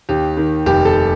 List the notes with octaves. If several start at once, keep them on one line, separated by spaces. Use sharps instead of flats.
D#2 G4
D#3
F1 G4
A4